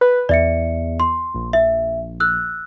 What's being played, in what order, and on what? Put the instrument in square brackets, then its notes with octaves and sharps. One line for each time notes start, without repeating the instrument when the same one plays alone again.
[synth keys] B4
[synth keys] E2 [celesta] D5 E5 C#7
[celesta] C6
[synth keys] A#1
[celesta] E5
E6 F#6